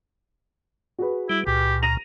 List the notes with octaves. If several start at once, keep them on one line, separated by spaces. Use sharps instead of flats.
F#4 G#4 B4
G3 E4
C#2 A#2 G4
A#5 A#6 D#7 F7